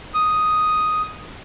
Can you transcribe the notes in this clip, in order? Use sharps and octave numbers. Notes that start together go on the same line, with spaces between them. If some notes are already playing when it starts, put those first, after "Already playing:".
D#6